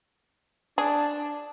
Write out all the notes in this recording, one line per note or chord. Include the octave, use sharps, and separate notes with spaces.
D4 G#4 A5